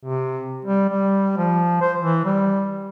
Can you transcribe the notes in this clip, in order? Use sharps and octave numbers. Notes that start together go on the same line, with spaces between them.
C3
G3
G3
F3
C5
E3
G3